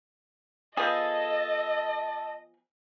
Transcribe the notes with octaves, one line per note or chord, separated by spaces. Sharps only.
F3 B3 G#4 A4 D#5